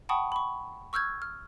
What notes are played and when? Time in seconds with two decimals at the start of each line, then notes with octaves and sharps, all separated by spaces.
0.09 F#5 G5 A5 B5 C#6 D#6
0.32 B5 C#6
0.93 C#6 E6 F6 G6 G#6
1.22 F6